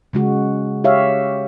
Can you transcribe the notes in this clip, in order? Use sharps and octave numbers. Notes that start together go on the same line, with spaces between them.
C#3 G#3 F#4
G4 C#5 E5 F5